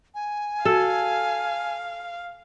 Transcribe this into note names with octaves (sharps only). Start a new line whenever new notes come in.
G#5
F#4 A4 F5